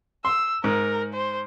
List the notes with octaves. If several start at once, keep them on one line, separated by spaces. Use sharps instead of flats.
C6 E6
G#2 A#4
C5